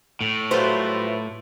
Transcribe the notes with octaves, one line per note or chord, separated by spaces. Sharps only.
A2
F#3 G3 A3 F4 B4 C5